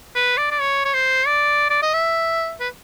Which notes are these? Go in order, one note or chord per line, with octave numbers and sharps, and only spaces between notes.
B4
D5
D5
C#5
C#5
C5
D5
D5
D#5
E5
B4